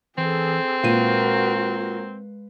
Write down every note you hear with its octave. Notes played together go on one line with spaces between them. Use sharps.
E3 C4 G#4 A4
A#2 G#3 F#4 A#4 B4 F5 D#7